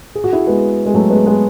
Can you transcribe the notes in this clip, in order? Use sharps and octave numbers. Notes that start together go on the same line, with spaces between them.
G#4
F#4
E4 G#4
G#3 B3
G#3
F#3 A3
G#3 B3
G#3 B3